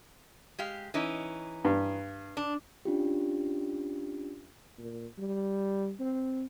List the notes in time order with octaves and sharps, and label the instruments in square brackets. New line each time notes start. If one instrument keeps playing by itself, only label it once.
[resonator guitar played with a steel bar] G#3 G4 F5
E3 C#4 D#4
[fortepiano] G2
[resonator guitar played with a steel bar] D4
[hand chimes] C#4 D4 F4 G4
[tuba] A#2
G3
C4